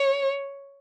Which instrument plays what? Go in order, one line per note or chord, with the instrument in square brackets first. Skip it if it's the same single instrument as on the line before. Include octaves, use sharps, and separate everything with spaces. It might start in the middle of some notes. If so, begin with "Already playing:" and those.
Already playing: [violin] C#5